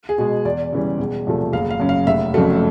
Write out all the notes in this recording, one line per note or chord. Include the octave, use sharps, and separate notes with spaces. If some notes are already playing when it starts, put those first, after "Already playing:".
G#4
B2 G#3
E2 D5
C#3 E3 G3
E1
E2 C3 F3 A3
F#1 F5
F5
F#2 C#3
F5
F1 E5
F2 C#3 F#3 A3